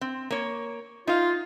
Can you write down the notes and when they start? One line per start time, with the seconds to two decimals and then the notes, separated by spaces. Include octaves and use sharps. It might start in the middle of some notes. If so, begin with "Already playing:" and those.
0.01 C4
0.30 A#3 C#5
1.07 D#4 F4 F5